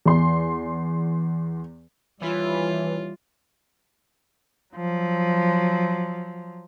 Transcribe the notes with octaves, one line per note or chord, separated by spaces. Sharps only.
E2 C6
D#2 E3 F3 G3 F4 C#5
F3 F#3